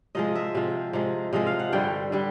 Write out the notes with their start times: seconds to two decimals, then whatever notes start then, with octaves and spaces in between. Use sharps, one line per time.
0.15 C3 F3 G#3 D#5
0.35 E5
0.55 C3 F3 G#3
0.93 C3 F3 G#3
1.33 C3 F3 G#3 D#5
1.47 F5
1.59 F#5
1.73 G2 D3 G3 G5
2.12 D3 G3